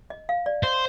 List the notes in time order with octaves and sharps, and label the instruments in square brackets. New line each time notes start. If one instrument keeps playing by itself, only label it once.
[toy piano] D#5
F5
D5
[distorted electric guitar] C5 [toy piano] D#5